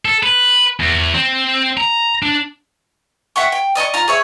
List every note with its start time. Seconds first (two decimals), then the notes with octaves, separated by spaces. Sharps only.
0.05 A4
0.23 B4
0.80 E2
1.14 C4
1.77 A#5
2.23 D4
3.36 E5 F#5 G5 C#6
3.52 G5
3.75 D5 D#5 A#5 C#6
3.94 F4 A#5
4.08 G#4 C#5 E5